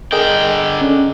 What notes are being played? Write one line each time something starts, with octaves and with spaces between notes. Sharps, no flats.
D3 G#4 A#4 D#5 G5
C#4